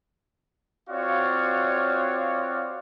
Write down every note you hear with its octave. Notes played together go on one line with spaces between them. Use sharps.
C4 F4 F#4 C#5 D5 F5